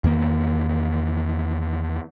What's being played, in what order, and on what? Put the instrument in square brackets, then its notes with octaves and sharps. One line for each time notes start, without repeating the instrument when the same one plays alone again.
[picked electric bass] E2 D#3 A#3